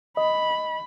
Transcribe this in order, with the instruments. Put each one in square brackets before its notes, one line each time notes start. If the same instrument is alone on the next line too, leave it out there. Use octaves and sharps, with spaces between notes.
[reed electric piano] D#5 [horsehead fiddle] B5